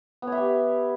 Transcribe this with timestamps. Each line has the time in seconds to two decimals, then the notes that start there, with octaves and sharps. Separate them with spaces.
0.22 B3
0.27 C#5
0.32 E5
0.37 G4